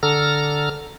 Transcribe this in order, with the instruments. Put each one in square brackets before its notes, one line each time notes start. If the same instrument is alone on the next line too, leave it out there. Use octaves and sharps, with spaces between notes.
[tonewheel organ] D3 A4 A#5 F6